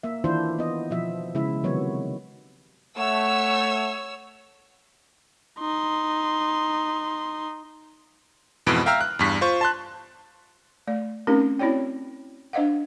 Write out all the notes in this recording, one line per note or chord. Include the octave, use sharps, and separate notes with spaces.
A#3 E5
D#3 E3 D4 E4 F4 C5
B3 D#5
B2 F3 E5
C#3 G#3 E4 E5
C3 D#3 F#3 B3 C#5
A3 C#5 F#5 E6
D#4 C6
F2 G#2 B2 E3 B4 D7
E5 F5 G5 A#5 E6 F6
F#6
E2 G2 B6
F4 C5 C#6
A5 C6 F#6
A3 D5
A3 C4 C#4 D#4 G4 A#4
C4 E4 F#4 C#5 D5 G5
D4 C5 D#5 F5 F#5